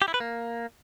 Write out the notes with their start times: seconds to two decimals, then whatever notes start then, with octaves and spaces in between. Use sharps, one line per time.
0.02 G4
0.08 E4
0.14 B4
0.20 A#3